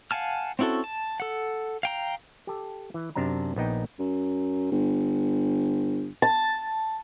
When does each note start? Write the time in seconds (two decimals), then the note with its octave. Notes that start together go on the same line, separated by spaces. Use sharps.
0.11 F5 F#5 G#5 A5 F6
0.59 C4 C#4 E4 F#4 A4
0.84 A5
1.20 A4 F#5
1.83 F5 G5 A#5
2.47 G4 A4
2.94 E3
3.15 F#2 C3 D4 A5 A#5
3.56 A#1 B3 D#4 G5
3.99 F#2
4.72 G1
6.22 A5